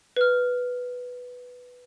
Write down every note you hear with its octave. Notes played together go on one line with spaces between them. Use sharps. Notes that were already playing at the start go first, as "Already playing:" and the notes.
B4 F6